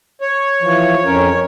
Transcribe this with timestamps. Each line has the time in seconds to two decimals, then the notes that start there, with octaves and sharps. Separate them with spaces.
0.21 C#5
0.62 E3 F3
1.05 F2 C#4 A#4